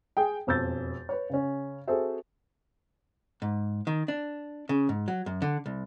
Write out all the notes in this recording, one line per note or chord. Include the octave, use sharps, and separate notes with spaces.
G#4 G5
E1 F2 E6 G6 A6
B4 C#5
C#3 C#4
C4 F#4 G#4 A4 C5 E5
G#2
D#3
D4
C#3
G#2
F#3
F#2
D3
C2